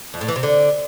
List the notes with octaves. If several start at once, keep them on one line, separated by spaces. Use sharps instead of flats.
F2
A2
E3
C3
D3